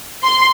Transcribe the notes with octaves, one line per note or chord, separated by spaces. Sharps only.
C6